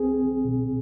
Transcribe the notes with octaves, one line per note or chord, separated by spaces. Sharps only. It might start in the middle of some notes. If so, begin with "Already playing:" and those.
Already playing: C2 C4 G#4
C4
B2